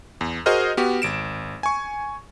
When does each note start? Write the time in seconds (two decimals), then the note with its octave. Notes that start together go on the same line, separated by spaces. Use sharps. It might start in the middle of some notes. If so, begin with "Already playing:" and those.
0.21 E2
0.46 F#4 G#4 A#4 C5 D#5 F6
0.77 B3 F#4 G4
1.02 G#1 D7 E7
1.63 G#5 C#6